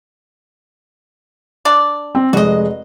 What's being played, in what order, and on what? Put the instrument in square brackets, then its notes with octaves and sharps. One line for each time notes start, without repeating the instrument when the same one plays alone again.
[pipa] D4 D5
[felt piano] C4
[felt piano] F1 G#3 [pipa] F#4 D#5